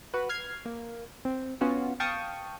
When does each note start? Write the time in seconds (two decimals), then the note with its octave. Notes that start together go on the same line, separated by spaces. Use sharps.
0.14 F#4 B4
0.29 F6 G#6 C7
0.65 A#3
1.25 C4
1.61 B3 C#4 F4 F#4
2.00 F5 G5 A5 C#6 D#6